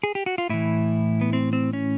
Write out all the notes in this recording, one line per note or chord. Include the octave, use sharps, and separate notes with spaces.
G#4
G4
F#4
F4
A2 E3 E4
B3
C4
C4
C#4